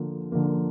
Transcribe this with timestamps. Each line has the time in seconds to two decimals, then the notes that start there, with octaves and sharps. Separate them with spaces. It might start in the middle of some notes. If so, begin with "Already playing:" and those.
Already playing: D3 F3 A#3
0.32 D3 F3 A#3